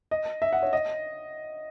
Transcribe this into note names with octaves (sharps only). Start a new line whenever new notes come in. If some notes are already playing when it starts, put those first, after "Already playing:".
D#5
E5
F#5
C#5
D#5